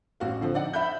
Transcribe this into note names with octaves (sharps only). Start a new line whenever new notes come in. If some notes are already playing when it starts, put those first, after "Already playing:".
A1 F#4 F5
D3 F3 C4
D#4 D5 F#5
E5 B5 G6